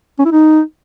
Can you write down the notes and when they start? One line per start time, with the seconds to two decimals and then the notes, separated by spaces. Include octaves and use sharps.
0.19 C#4
0.25 E4
0.31 D#4